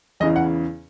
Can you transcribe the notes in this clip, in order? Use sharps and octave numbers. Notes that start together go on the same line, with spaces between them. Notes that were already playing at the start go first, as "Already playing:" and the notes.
E2 C#3 E3 D#5
F#5